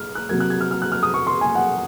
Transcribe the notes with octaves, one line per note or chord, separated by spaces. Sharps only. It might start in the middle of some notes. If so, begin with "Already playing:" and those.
Already playing: D#6 F6
F#6
C3 F#3 A#3 G#6
F#6
G#6
F6
F6
F#6
F6
D#6
C#6
C6
G#5
F#5